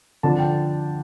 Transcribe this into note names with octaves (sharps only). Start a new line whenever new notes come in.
D3 F3 D4 A5
G5